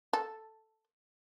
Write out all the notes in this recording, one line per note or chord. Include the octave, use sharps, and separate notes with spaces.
A4